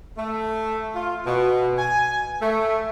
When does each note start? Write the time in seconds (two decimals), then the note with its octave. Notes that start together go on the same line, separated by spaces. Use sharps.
0.17 A3
0.94 F4
1.26 B2
1.77 G#5
2.41 A3